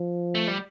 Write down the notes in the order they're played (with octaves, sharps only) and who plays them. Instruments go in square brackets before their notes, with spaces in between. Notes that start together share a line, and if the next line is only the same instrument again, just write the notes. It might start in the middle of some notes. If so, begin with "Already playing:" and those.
Already playing: [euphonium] F3
[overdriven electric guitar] A3
G3